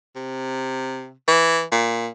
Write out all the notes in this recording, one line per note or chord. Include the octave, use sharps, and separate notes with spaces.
C3
E3
A#2